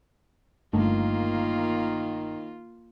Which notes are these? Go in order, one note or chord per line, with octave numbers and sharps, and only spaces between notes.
G1 D#3 A3 A#3 D4 F4